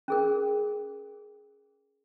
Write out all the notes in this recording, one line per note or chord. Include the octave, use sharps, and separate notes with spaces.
C#4 G#4 A#4